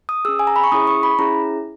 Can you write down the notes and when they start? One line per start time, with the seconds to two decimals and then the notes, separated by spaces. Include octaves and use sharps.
0.09 D#6
0.25 C#4 G#4 E6
0.39 G#5
0.47 A#5
0.56 B5
0.64 C#6
0.72 C#4 E4 G#4 D#6
0.87 C#6
1.03 B5
1.19 C#4 E4 G#4 A#5